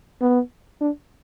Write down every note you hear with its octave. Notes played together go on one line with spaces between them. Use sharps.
B3
D4